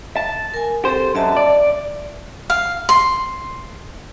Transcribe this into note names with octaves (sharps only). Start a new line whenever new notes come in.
A5
A#4 G#5
C4 G4 A4 C5
F#2 D#5 E5 A5
D5
F5
C6